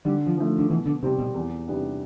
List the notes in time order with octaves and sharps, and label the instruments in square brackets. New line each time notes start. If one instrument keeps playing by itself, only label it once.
[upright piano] D3 [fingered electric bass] G3
[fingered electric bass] F3
[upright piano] F3 A3
[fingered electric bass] D3
[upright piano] B2 [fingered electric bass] E3
[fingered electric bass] D3
[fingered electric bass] C3 [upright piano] G3 C4
[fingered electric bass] B2
[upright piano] E2
C3 G3 B3 D4